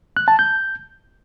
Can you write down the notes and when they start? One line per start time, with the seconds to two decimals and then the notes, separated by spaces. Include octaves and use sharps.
0.17 F#6
0.28 A5
0.39 G6